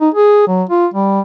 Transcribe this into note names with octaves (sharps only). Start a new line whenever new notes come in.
D#4
G#4
F#3
F4
G3